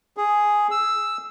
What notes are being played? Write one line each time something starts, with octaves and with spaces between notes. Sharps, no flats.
G#4
E6